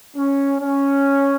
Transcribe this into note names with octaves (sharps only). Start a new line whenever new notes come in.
C#4
C#4